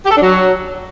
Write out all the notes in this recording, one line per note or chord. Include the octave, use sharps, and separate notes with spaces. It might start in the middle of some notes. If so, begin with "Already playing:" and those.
G4
A4
D4
F#3